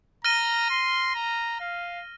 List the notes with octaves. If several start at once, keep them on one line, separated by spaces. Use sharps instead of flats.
A#5 F6 A#6 D#7 G7
C6
A#5
F5